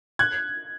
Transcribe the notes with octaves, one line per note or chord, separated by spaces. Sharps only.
F#6 G#6